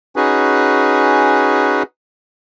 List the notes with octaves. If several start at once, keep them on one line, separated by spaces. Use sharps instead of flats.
C#4 D#4 F#4 G#4 B4